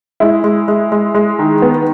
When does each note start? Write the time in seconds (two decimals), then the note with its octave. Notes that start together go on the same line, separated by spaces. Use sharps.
0.20 G#3 E4
0.44 G#3
0.68 G#3
0.92 G#3
1.14 G#3
1.39 D#3
1.62 B3